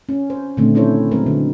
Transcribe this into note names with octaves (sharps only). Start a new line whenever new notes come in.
C#4
C5
A#2 D3 D#3 A3 C4 D4
C4 C#4 E4 A4 C5 C#5
F#3 G#3 B3 C4 A#4
D3